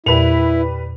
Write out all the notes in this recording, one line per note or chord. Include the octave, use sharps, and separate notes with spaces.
E2 A#2 G3 E4 B4 F7